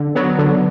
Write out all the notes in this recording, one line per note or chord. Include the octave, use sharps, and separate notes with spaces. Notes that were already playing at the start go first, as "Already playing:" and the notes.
Already playing: D3
F#3 B3
D3